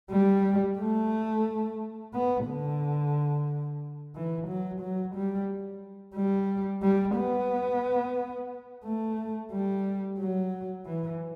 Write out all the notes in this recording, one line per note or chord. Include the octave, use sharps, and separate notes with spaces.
G3
A3
B3
D3
E3
F#3
F#3
G3
G3
G3
B3
A3
G3
F#3
E3